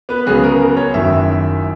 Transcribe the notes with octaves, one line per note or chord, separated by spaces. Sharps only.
B3 B4
C#2 C#3 F#3 B3 G#4
A#4
A#4
C#4 C#5
F#1 F#2 D#3 E4 E5